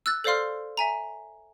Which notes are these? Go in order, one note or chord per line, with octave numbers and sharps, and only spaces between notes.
E6 F#6 A6
A4 C5 D5 F5 C6 F6
E5 G#5 A#5